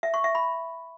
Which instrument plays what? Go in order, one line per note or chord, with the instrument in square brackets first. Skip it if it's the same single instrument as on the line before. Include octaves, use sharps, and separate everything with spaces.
[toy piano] E5
C#6
E5
B5